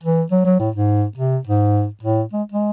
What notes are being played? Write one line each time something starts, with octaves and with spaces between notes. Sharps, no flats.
E3
F#3
F#3
A2
G#2
C3
G#2
A2
G#3
G#3